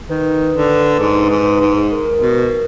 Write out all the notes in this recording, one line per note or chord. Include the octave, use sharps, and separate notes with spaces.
D#3 B4
D3
G#2
G#2
G#2
A#4
B2